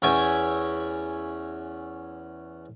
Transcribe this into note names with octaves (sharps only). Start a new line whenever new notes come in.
E2 C#4 E5 G5 G#5